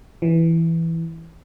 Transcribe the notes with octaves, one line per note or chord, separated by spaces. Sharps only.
E3